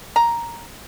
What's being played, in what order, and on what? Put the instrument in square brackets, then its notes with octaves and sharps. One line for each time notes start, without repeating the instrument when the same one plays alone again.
[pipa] A#5